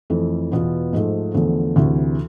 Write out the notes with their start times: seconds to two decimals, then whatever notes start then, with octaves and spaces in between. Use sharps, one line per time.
0.10 F2 E3 A3
0.52 E2 B2 B3 F4
0.93 G#2 F3 A3
1.34 E2 D3 F3 A3
1.76 D2 C3 E3